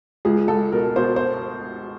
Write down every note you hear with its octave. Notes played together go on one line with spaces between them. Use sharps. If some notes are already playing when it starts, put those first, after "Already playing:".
C#2 G#4
C#2 A4
B2 A#4
B2 C5
C5